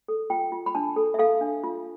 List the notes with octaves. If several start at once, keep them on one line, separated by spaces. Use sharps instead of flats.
A4
F4 G5
F4
B5
D4 A5
A4
E5
A4 F5
D4
F4